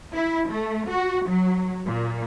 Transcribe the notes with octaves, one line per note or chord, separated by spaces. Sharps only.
E4
A3
F#4
F#3
A#2